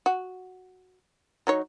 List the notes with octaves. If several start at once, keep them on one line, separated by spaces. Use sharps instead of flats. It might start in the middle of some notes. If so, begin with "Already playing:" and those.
F#4
F#3 D#4 C#5